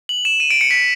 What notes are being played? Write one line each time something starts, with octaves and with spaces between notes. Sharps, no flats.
F#7
E7
D#7
D7
C#7
B6